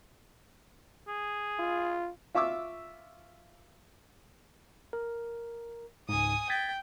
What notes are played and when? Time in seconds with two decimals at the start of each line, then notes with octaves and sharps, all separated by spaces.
1.08 G#4
1.59 F4
2.35 F4 E5 C#6 D6 E6
4.93 A#4
6.09 C#2 G#2 G#5 D#6
6.50 G5 G#6 A6 B6